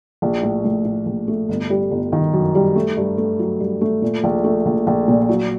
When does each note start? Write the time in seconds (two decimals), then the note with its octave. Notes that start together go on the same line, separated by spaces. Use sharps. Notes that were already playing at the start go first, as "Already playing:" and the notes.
0.22 A#1
0.43 A2
0.64 A2
0.85 A2
1.06 A#1
1.28 A3
1.49 G1
1.70 G3
1.91 G1
2.12 D#3
2.33 F#2
2.55 G3
2.76 A3
2.97 G2
3.18 A3
3.39 F#3
3.60 G2
3.81 A3
4.02 A#2
4.24 A#1
4.44 A3
4.66 A#1
4.87 A#1
5.08 A#2
5.29 F#3